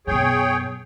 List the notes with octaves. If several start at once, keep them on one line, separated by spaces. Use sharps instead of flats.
F#2 B2 G#4 C#5 G5